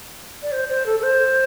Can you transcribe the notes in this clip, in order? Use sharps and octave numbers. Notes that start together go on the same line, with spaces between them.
D5
C5
C5
A4
A4
C5